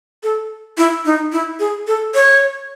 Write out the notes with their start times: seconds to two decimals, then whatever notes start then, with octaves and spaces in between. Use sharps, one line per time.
0.23 A4
0.78 E4
1.05 D#4
1.32 E4
1.59 G#4
1.87 A4
2.15 C#5